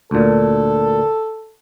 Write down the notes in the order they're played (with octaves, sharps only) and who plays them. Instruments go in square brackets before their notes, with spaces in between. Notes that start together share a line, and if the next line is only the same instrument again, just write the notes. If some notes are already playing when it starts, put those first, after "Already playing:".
[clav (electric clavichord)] D2 A#2 [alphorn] A4